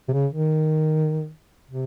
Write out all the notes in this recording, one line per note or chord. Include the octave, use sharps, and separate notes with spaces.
C3
C#3
D#3
C3